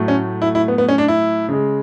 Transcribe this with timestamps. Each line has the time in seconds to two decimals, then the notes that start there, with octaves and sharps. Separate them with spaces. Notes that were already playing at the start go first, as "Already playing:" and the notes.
Already playing: A2 F#3 A3
0.08 C#4
0.42 E4
0.55 E4
0.68 B3
0.78 B3
0.88 C#4
0.98 D4
1.08 E4
1.49 C#3 G#3